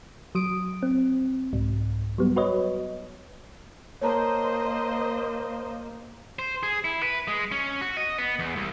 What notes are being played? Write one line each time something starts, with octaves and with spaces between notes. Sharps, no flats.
F#3 D#6 D7
C4
C2 G#2
F#3 G3 B3
F#4 B4 C#5 D#5
A#3 C5 C#5 D#5 A5 A#5
C5
G#4
E4
B4
G#3
C#4
F#4
D#5
B3
E2
C2